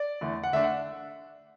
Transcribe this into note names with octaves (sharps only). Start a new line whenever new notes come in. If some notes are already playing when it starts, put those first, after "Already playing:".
Already playing: D5
E2 D3 A3
F#5
D3 A3 D4 E5
F#5